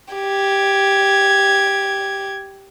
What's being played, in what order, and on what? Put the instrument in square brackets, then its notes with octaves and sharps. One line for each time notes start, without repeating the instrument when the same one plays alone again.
[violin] G4 G#6